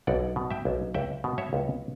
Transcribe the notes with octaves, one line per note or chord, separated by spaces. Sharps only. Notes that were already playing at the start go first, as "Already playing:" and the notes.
B1 D5 F#5
B2
E5 G5
B1
C#2 E5 G5
B2
C#5 E5
C#2